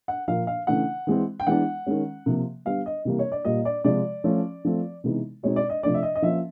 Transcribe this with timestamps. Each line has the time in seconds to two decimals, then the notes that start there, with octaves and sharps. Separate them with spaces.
0.08 F#5
0.28 A#2 F3 A#3 F5
0.47 F5
0.67 C#3 E3 A3 D4 F#5
1.07 E3 G#3 C4
1.40 G5
1.47 E3 G#3 B3 D4 F#5
1.86 D#3 G#3 C#4
2.26 C3 F3 A#3
2.65 D3 G3 B3 F5
2.86 D#5
3.05 C3 E3 G3 A#3
3.19 C#5
3.32 D5
3.45 A#2 G3 A#3 D#5
3.65 D5
3.84 C3 F3 G#3 D5
4.24 F3 A3 C#4
4.65 F3 A3 C4
5.04 C3 E3 G#3 B3 D#4
5.43 B2 G#3 C4 D#4 C#5
5.56 D5
5.70 D#5
5.83 C3 F3 A3 D4 D5
5.94 E5
6.03 D#5
6.16 D#5
6.22 F3 A#3 C#4 E5